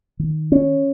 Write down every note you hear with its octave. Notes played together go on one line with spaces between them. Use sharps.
D#3
C#4